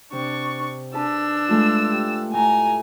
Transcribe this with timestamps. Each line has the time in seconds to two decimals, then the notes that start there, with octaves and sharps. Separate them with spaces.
0.12 C3 D4 C#6
0.94 D4 G#4 B4 A5 E6
1.48 G#3 A3 F4
1.91 G4
2.33 A2 G#5 A#5